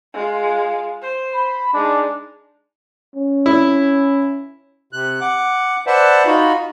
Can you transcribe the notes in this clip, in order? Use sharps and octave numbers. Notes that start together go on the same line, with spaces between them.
G#3 F4
C5
B5
G#3 D4 D#4
C#4
E4
C3 F#6
F#5 D6
B4 C5 D5 E5 F#5 A5
D#4 F4 F#4 B5